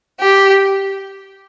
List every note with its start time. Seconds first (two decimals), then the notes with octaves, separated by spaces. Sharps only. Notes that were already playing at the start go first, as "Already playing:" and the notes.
0.20 G4